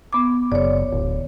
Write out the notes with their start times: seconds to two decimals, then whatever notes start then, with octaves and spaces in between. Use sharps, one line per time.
0.13 B3 D6
0.52 F#1 C#5 D5
0.91 D1